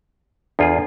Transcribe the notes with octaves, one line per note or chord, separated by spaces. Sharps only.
E2 D4 F4 G#4 A4 D5